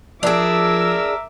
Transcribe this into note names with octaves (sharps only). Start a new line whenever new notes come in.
F3 D4 G#4 A#4 E5 D6 E6